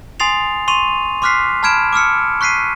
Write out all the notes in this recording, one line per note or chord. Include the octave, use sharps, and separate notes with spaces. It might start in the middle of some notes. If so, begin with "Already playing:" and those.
G#5 C6 D#6 A6 C7 F7
C6 C#6 D#7 F7
C6 D6 F6 F#6 B6 C7
A5 B5 F6 G#6 D7 E7
D6 E6 F6 C#7
C#6 F#6 B6 C7 D#7